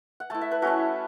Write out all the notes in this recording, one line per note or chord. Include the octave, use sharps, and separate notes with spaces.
F#5
A3 E4 A5
E5
B4
A3 C#4 E4 F#4